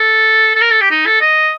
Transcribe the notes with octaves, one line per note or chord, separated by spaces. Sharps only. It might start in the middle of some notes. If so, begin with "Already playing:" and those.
Already playing: A4
A4
A#4
A4
G4
D#4
A4
D#5